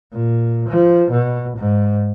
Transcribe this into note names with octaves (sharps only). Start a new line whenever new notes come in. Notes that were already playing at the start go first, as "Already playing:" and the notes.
A#2
F3
B2
G#2